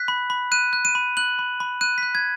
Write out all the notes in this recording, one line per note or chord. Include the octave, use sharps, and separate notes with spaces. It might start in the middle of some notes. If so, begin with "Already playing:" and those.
Already playing: F#6 B6
B5
B5
F#6 D#7
F#6
D#7
B5
F#6 F#7
B5
B5
F#6 D#7
F#6 B6
G#6